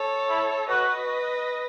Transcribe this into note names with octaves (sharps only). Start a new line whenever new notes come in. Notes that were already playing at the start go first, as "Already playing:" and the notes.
Already playing: A4 C#5
E4
F#4 B4 D#5